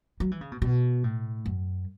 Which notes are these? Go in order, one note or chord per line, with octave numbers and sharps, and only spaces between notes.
F#3
E3
C#3
B2
B2
A2
F#2